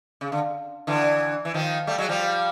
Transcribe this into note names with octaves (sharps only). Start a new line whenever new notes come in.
C#3
D3
D3 E3
E3
D#3 F3
G3 A3
F#3 G#3
F3 G3